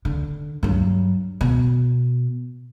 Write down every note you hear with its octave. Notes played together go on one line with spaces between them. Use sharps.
D3
G2 F#3
B2